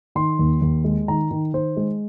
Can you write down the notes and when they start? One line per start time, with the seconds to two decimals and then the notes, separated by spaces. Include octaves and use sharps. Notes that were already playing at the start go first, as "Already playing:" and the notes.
0.15 D#3 C6
0.39 D#2
0.62 D#2
0.84 G#3
1.08 D#3 A#5
1.31 D#3
1.53 D#3 C5
1.77 G#3